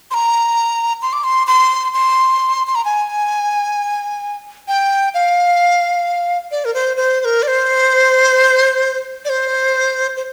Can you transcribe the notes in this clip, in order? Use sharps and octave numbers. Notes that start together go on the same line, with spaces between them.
C6
A#5
C6
D6
C6
C6
C6
C6
A#5
G#5
G5
F5
D5
A#4
C5
C5
C5
A#4
D5
C5
D5
C5
C5